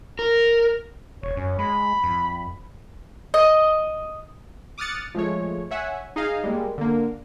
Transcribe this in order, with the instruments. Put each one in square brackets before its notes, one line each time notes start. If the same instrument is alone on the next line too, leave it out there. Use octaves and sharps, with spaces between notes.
[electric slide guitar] A#4
[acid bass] E1 [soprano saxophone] C#5
[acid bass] F#2 [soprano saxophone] C#4
[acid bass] G#3 [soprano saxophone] B5
[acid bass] F2
[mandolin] D#5
[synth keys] D6 D#6 F6 F#6 A6 C#7
F3 G#3 A3 C#5
C#5 E5 F#5 G#5
D#4 G#4 D#5 F5
G3 G#3 A#3
D3 A#3